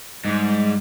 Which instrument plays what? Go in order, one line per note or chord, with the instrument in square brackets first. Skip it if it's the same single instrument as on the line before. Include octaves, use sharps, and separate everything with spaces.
[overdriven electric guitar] G#2 [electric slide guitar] G3